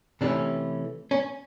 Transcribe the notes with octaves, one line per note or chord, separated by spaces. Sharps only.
C3 E3 A3 C#4 D4
C#4